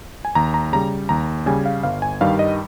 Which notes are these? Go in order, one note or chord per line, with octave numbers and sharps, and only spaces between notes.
G#5
D#2 A#5
A#5
C#3 G3 A#5
D#2 A#5
C#3 G3 G#5
F5
G1 F5
G#5
G2 D#3 G3 F5
D#5